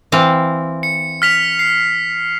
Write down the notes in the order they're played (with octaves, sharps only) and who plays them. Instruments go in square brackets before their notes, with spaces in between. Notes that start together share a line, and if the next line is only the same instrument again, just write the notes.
[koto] E3 C4 F5
[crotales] C#7
F6 B6 F7
C7